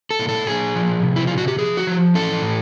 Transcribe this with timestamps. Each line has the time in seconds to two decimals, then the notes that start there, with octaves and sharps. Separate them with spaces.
0.11 A4
0.19 A#2
0.29 A4
0.47 A#2 G#4
0.75 F3
1.02 C3
1.16 E4
1.27 C3 F4
1.38 F#4
1.48 G4
1.59 F3 G#4
1.77 F#4
1.87 F3
2.15 E3 A4
2.42 A2